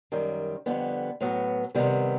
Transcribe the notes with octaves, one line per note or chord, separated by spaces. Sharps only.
F#2 D#3 G3
F2 D3 G3 B3
A2 F#3 B3
C3 D#3 G3 B3